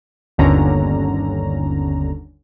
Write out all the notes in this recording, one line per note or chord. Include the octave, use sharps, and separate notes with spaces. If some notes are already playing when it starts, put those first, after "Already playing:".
G1 D#2 D3 C#4 A#5